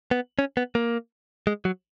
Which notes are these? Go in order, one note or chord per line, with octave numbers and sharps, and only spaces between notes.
B3
C#4
B3
A#3
G#3
F#3